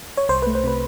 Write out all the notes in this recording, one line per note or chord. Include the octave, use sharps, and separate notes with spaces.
C#5
C2 C5
B4
A3
C5
C3 B4